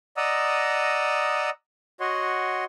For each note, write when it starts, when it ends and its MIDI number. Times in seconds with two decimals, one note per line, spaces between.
0.17 1.50 74
0.17 1.50 75
0.17 1.50 78
0.17 1.50 82
0.17 1.50 87
0.17 1.50 88
2.00 2.64 66
2.00 2.64 73
2.00 2.64 75
2.00 2.64 78
2.00 2.64 84